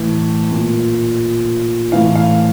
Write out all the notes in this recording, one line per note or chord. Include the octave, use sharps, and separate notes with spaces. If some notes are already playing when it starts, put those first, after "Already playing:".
Already playing: A2 E3
A#2
A2 E3 F5
F5